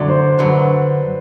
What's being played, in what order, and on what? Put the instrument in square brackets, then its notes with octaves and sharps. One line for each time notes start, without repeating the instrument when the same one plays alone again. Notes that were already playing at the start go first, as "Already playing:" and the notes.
Already playing: [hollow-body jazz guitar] F#2 D3 F#3 [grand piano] D5
[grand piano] C5
[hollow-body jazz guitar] F#2 D3 F#3 [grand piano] B4